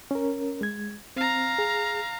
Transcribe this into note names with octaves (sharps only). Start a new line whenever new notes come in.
C#4 A#4
G#3 G#6
C4 F5 A#5
G#4